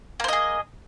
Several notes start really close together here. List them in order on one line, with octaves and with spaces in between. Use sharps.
A#3 C5 D#5 G#4